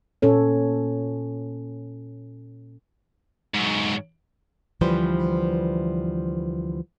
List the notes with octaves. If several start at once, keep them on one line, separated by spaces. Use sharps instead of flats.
A#2 C#4 A4 C#5
G#2 F#3
D2 E3 F3 G3 B4 C5